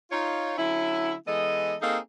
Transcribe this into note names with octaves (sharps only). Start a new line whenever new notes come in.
D#4 F4 C#5
D3 F#3 C#4 E4
E3 G#3 B3 A4 D#5
A#3 C4 D#4 G#4 A4 F5